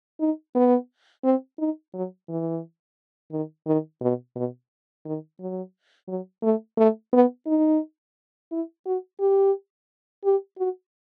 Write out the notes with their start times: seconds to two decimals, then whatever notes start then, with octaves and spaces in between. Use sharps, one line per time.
0.20 D#4
0.55 B3
1.24 C4
1.59 D#4
1.94 F#3
2.29 E3
3.31 D#3
3.67 D#3
4.01 B2
4.36 B2
5.05 D#3
5.40 F#3
6.08 F#3
6.43 A3
6.78 A3
7.13 B3
7.47 D#4
8.52 E4
8.86 F#4
9.20 G4
10.25 G4
10.58 F#4